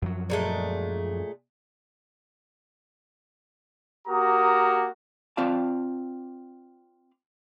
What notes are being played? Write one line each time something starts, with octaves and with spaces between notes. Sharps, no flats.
F#2 F3 F#3
A#2 G#3 A3
A#3 F#4 G4 A#4 A#5 D#6
C4 F4 D5 F5 A5